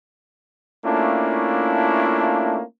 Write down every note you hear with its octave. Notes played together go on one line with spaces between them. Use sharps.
A3 A#3 C#4 D4 E4 F4